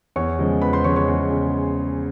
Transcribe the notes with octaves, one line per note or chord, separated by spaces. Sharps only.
E2 C#5 C#6
C#3 F3 G#3
E2 B4 B5
C5 C6
C#3 F3 G#3 C#5 C#6
C#5 C#6
E2
C#3